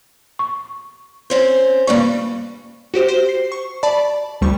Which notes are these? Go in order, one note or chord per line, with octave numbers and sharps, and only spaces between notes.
C#6
C4 C#4 C5
G2 C#3 G3 A#3 C#6
F#4 G4 C5
C5
C7
C#6
D5 A5 B5
D2 G3 C#6